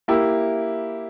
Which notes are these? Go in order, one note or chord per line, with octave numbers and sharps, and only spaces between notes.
A#3 E4 G4